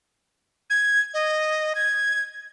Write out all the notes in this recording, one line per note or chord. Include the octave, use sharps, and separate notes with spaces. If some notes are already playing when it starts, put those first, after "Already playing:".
G#6
D#5
G#6